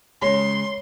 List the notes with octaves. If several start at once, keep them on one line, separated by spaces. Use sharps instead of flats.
C#3 G#3 C#5 C6